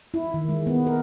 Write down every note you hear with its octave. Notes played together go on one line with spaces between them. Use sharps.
E4
D#3
G#3
B3
A#4